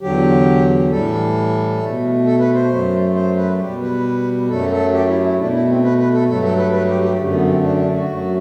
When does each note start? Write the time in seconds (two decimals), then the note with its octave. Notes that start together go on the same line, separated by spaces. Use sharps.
0.01 E2 D3 F#3 G4
0.90 A2 E3 G3 A4
1.80 B2 A3
2.25 A4
2.40 B4
2.54 C5
2.70 F#2 F#3 A3
3.14 C5
3.37 B4
3.59 B2 G3 G4
3.82 B4
4.49 F#2 F#3 A3 A4
4.71 A4
4.94 G4
5.08 E4
5.24 E4
5.38 B2 A3 D4
5.53 E4
5.69 C4
5.83 B4
5.98 B4
6.13 A4
6.28 G2 F#3 A3 A4
6.43 A4
6.58 B4
6.72 B4
6.88 G4
7.02 G4
7.18 F#2 D3 A3
7.33 B3
7.47 C4
7.62 D4
7.77 D4
7.93 F#4
8.08 F#2 F#3 A3